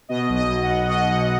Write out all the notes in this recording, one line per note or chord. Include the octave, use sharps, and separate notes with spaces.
B2 D#5
B1
D#5
B1
F#5
B2
B2 D#5
B1 F#5